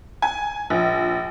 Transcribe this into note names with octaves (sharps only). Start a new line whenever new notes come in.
G#5
A#1